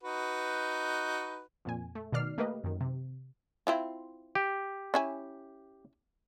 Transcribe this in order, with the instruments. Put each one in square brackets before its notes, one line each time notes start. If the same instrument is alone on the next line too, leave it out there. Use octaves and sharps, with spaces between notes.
[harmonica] D#4 F#4 B4
[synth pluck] F2 A#2 G#5
A3
B2 D#3 D#4 D5 F6 C7
A3 A#3 G4 A#4 B4 D#5
F#2 D#3
C3
[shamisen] C4 E4 F4
[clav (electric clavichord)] G4
[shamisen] C#4 E4 G#5